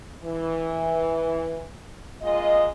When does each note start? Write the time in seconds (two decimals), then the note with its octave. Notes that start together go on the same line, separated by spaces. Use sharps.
0.24 E3
2.22 A#2 G#3 F4 D#5